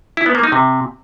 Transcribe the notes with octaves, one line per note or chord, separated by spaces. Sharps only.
E4
B3
A#3
D#4
C3